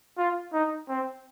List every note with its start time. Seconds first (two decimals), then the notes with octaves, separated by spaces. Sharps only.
0.18 F4
0.53 D#4
0.89 C4